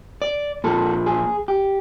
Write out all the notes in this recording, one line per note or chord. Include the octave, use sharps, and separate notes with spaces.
D5
A#2 F3 A4
G#4
G4